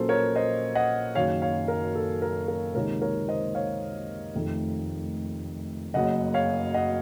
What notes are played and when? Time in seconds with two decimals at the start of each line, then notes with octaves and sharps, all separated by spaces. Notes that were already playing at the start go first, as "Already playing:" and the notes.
Already playing: A#1 A#2 F#3 A#3 C#4 A4 C5
0.09 A#4 C#5
0.35 C5 D#5
0.75 D#5 F#5
1.15 F#1 F#2 D#3 C#5 F5
1.42 C#5 F5
1.68 A#4
1.95 A4
2.22 A#4
2.48 A#4
2.75 C#2 C3 D#3 A#3 D#4 A#4 C#5
3.02 A#4 C#5
3.28 C5 D#5
3.55 C#5 F5
4.35 F1 F2 D#3 A3 C4
5.94 F#1 F#2 C#3 D#5 F#5
6.34 C#5 F5
6.74 D#5 F#5